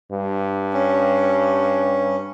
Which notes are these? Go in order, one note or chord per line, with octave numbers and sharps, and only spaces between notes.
G2
C#4